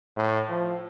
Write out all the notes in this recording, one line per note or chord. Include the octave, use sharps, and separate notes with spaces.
A2
F3